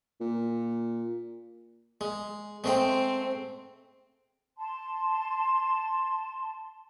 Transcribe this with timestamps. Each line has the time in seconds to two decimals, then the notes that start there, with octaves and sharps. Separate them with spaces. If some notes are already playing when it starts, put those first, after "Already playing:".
0.21 A#2
2.01 G#3
2.64 G#3 A3 C4 G5
4.57 A5 C6